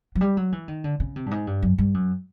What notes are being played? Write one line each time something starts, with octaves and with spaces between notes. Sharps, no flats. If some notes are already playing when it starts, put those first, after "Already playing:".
F#3
G3
F#3
E3
D#3
D3
C#3
C3
G2
G#2
G2
F#2
G2
F#2